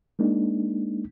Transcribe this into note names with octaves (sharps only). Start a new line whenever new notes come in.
G#3 A#3 D4 D#4